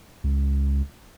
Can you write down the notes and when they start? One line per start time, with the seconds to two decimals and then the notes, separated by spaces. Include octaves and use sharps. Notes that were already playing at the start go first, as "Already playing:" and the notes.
0.24 C#2